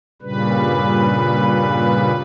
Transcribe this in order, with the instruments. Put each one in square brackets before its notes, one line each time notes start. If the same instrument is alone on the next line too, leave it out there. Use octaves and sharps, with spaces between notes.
[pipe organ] G2 A#2 C#3 G3 B4